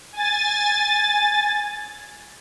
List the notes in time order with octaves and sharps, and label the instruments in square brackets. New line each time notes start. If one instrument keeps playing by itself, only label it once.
[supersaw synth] G#5 A6